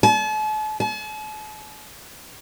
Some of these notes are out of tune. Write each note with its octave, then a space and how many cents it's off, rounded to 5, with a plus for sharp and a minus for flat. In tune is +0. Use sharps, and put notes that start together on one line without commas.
A5 -40
A5 -45